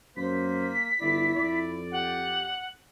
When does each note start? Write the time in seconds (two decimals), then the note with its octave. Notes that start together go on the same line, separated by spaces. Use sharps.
0.17 F#2 A#3 C5 B6
1.00 G1 E4 D5
1.36 F2 D5
1.92 G4 F#5